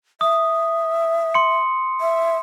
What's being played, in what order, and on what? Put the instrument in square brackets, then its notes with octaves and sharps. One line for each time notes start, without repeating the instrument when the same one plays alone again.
[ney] E5 [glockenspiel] D#6
[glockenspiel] C6 C#7
[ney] E5